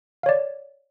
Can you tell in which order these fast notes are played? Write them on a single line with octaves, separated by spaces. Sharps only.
F5 C#5 D5